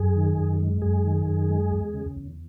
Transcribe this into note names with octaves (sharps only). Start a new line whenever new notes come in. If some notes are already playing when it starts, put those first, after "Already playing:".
Already playing: F#2 G#4
D#3
F#2
G#3
F#2 G#4
D#3
F#2
G#3
E2
C#3
E2